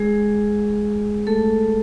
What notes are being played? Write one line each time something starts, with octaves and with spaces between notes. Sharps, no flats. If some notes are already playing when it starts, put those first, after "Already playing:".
Already playing: G#3 G#4
A3 A4